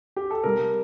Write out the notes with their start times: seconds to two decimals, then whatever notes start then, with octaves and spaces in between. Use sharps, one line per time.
0.16 G4
0.31 A4
0.44 C3 G3 A#4